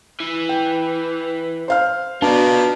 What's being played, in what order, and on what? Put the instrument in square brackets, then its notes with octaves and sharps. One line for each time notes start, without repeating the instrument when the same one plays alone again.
[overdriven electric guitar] E3
[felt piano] G5
C5 F5 F6
[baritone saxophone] B2 [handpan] D4 [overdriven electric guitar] F4 D5 [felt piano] A5